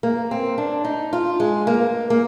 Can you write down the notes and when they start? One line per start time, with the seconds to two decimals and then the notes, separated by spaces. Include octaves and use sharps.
0.03 A#3
0.31 C4
0.58 D4
0.85 D#4
1.13 F4
1.40 G#3
1.67 A#3
2.10 A#3